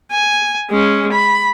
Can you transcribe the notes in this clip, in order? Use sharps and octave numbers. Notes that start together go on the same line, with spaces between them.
G#5
G#3 C#4
B5